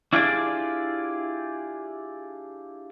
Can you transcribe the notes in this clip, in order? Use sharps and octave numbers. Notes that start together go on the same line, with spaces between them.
D4 E4 F4 G4 G#4 D5